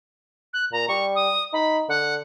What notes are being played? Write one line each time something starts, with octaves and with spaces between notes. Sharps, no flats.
F#6
A#2 A#5
G3 C#6
D#6
D#4 B5
D3 F#5